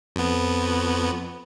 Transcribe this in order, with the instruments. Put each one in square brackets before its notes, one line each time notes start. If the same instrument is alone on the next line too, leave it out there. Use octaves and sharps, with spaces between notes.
[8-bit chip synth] F2 B3